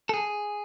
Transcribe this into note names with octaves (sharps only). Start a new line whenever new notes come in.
A4
G#4